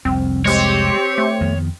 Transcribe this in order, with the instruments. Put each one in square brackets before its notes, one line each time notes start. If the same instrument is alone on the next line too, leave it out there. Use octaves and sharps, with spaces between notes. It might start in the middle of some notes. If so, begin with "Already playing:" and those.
[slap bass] F1 C2 F2 [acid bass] C4
[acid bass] G#3 [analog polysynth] C4 G4 C5 [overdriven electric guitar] C#5
[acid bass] A3
[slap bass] F2 D#3 B3